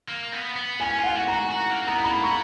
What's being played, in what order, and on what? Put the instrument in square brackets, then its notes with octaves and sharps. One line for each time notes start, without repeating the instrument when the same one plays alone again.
[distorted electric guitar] A#3
B3
B3
[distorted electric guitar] C#4 [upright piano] G#5
[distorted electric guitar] F4
[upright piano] F#5
[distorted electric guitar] F#4
[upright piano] A#5
[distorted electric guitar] F#4
F#4
A#3
[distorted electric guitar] B3 [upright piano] A#5
[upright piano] A#5
[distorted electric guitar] A#3 [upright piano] B5
[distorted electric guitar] B3 [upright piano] C#6